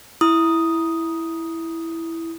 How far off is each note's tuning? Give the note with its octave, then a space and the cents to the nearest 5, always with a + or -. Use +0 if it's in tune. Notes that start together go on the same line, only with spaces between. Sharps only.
E4 +0 D#6 +0